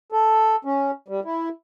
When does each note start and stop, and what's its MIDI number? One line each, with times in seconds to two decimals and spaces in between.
0.12 0.56 69
0.65 0.91 61
1.08 1.20 55
1.25 1.49 64